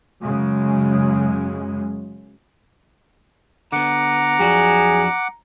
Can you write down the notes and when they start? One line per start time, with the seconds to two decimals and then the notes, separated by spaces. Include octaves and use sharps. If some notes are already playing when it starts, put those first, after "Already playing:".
0.22 F#2 C#3 G#3
3.72 D3 B3 F#5 A#5 D6
4.40 F2 F#3 D4 G#4